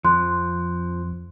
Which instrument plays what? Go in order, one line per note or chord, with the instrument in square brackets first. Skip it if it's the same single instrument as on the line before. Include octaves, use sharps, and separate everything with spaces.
[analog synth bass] F2 [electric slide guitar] F3 [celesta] C6 F#6